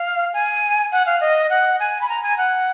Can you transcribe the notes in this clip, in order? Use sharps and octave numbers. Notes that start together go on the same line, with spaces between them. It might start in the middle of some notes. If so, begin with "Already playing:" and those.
Already playing: F5
G#5
F#5
F5
D#5
F#5
G#5
B5
A#5
G#5
F#5